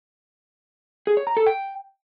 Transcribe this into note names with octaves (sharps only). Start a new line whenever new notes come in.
G#4
C#5
A#5
A4
G5